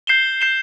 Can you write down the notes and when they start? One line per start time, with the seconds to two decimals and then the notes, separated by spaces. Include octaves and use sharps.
0.07 G6 C7 E7 G7
0.41 G6 C7 E7 G7